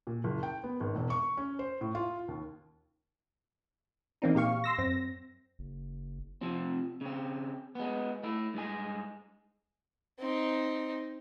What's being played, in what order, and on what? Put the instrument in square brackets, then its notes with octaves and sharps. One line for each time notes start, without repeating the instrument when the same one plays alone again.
[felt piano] A#2
F#1
G5
B3
G#1
E1
C#6
C#4
C5
A2
F4
D#2
[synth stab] E3 A#3 C4 D4 D#4
A#2 G4 F5 C#6
C6 E6 A#6
F#2 C4 A#6
[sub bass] F#1
[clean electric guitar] C3 F3 C4
C#3 C4
G#3 B3
A3 E4
G2 G#3 G#5
[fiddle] C4 D#4